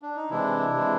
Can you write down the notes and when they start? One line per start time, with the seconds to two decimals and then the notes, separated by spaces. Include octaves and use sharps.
0.02 D4
0.16 D#4
0.30 C3 E3 G#3 D4 E4
0.74 C3 E3 G#3